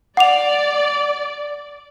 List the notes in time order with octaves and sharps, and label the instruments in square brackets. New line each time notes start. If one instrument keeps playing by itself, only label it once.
[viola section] D5 [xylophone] F#5 D6 F7